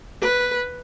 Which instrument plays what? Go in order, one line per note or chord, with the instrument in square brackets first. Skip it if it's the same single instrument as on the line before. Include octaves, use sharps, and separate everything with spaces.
[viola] B4